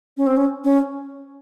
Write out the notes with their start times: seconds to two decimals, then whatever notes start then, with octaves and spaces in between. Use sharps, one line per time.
0.17 C#4
0.27 C4
0.37 C#4
0.64 C#4